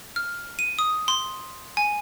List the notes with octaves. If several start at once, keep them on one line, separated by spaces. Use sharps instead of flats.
F6
D#7
D#6
C6
G#5